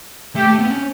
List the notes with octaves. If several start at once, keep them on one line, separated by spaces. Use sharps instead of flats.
A3 G4
A3
B3
C#4